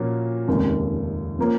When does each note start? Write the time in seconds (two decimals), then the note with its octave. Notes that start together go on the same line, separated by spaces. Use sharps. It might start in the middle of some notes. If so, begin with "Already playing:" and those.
Already playing: A#2 F3 A#3 C#4 F#4
0.48 F1 D#2 C#3 G#3
1.39 F3 A#3 C#4